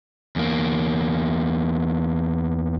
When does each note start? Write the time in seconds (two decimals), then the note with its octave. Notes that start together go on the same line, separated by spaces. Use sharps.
0.36 E2 A#3